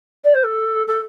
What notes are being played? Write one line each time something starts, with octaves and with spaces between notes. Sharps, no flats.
D5
C5
A4
A4